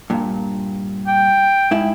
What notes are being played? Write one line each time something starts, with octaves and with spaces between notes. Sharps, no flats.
G2 A#2
G5
G#2 E4